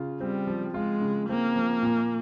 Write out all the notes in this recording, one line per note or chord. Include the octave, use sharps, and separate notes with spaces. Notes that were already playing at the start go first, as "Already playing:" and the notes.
Already playing: C#3 F4
G3 C4
F3
G#3 F4
C#3
A#3 C4
F3
A#2